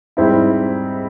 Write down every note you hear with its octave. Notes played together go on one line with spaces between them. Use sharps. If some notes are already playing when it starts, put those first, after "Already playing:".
G#2 G3 C4 E4